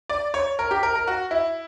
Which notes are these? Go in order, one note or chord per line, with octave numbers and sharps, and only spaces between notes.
D5
C#5
A#4
G4
A#4
A#4
F#4
E4